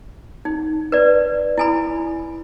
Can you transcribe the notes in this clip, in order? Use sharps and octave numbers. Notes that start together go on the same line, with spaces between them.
D#4
B4 D5
E4 G#5 B5